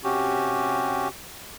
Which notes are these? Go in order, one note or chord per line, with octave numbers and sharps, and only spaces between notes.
C3 C#4 F#4 G4